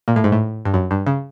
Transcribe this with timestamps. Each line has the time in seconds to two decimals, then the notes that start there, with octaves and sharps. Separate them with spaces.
0.08 A#2
0.16 A2
0.24 G#2
0.32 A2
0.65 G2
0.74 F#2
0.91 G2
1.07 C#3